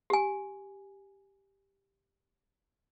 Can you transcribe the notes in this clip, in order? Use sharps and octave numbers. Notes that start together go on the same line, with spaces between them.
G4 G#5